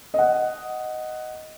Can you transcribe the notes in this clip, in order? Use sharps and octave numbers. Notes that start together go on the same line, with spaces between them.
D#5 F#5